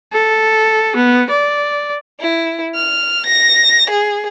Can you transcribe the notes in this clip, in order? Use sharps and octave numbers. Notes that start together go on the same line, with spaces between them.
A4
B3
D5
E4
F6
A#6
G#4